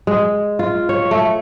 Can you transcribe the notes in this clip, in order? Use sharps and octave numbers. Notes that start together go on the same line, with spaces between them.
G#3
F4
C#5
A3